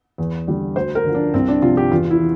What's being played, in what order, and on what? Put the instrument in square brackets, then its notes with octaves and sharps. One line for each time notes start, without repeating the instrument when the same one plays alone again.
[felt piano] E2
D3 G3
D2 C5
A#4
D3 F3
D4
C2 C4
D4
C3 F3 F4
G4
E2 F4
E4
E3